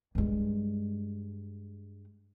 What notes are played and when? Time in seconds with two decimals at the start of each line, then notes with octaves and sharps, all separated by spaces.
0.15 G2 G#3